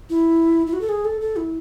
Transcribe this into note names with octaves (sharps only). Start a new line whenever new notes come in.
E4
E4
F#4
A4
G#4
A4
A4
E4